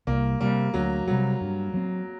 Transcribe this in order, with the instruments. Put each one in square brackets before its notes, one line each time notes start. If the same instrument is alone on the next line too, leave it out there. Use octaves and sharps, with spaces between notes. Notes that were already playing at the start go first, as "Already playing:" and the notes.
[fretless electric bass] C2 [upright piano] A#3
[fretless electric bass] C3 G3 [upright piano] A#3
[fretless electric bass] D2 [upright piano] F#3
[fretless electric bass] C3 G3 [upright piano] F#3
[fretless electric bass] G2
F#3 C4